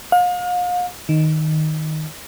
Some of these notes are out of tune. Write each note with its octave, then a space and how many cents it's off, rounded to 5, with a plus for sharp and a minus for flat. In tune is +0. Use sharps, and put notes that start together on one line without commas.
F5 +40
D#3 +0